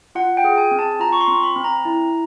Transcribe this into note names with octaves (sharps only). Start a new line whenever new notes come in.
F4 F#5
G5
G#4
G#5
C4
A5
F4 A#5
C#6
C6
C4
B5
C4
A#5
E4